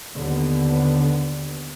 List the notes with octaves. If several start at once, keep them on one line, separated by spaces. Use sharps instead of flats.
D#2 D3 B3